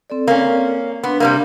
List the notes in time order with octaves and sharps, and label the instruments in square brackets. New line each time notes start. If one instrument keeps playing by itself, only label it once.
[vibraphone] C4 A4 D5
[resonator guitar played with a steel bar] A#3 C#4
[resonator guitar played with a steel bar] B3 [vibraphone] D4 C6
[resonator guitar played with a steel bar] C3 G3 A#3